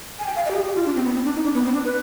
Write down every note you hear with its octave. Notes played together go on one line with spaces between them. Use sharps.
G#5
G5
F5
D#5
G4
G#4
G4
F4
D4
C4
B3
C4
D4
D#4
D4
B3
C4
D4
B4